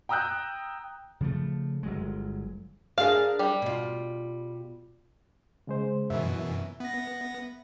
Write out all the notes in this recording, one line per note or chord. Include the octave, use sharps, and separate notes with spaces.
G5 A#5 D#6 E6 F#6 G6
C#3 F3 F#3 A3
G1 F#3 G#3
D4 G#4 A#4 F5
G3
B2 F4
C#3 G#3 C5
F#2 B2 E3 E5
B3 A#6